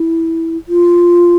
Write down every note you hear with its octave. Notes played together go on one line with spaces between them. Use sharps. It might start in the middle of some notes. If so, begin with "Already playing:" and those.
Already playing: E4
F4